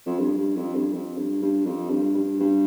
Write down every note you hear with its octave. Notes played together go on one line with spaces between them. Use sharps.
F2
G2
G2
F2
G2
F2
G2
G2
F2
G2
G2
G2